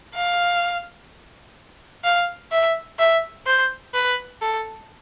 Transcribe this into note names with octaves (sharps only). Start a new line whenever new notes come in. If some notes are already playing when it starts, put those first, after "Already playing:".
F5
F5
E5
E5
C5
B4
A4